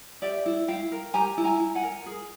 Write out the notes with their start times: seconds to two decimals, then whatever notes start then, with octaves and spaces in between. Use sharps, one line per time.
0.22 G4 D5 E5
0.46 E4
0.68 E4 F5 G5
0.92 A#4
1.14 G4 G#5 A#5
1.38 E4
1.44 G#5 A#5
1.60 E4
1.75 F#5 G#5
1.83 A#4
2.06 G#4